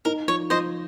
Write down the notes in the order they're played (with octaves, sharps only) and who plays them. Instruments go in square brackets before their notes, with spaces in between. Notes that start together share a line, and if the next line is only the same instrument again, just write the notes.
[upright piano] D#4 [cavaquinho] A#4
[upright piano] F3 [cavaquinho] C#5
[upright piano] F3 [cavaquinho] C5 D#5